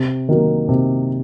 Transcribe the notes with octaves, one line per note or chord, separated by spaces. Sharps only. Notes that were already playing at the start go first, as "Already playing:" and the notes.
Already playing: C3
D#3 F#3 A#3
C3